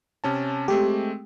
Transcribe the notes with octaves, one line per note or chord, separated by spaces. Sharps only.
C3 C#4 A5
G#3 A3 C4 G4